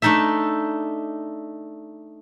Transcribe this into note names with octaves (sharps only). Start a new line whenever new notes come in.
A3 D4 D#4 A4 E5